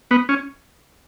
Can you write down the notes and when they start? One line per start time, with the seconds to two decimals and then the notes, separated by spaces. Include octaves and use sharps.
0.11 B3
0.29 C#4